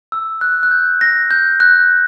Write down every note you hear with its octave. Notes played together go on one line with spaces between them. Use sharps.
E6
F#6
F#6
G6
A#6
G6
F#6